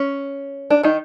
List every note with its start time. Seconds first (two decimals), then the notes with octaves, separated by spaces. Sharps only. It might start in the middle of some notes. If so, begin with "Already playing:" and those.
Already playing: C#4
0.70 D4
0.83 D#3 D#4